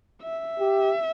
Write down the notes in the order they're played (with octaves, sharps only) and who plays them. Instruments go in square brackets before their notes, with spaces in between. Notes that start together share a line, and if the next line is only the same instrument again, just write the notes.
[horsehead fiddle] E5
[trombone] G4